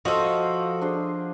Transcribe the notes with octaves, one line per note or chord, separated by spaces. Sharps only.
F3 F4 F#4 A4 D#5
D4 G#4 C5